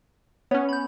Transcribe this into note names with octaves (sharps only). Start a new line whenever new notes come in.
B3 C#4 C#5
B5 G6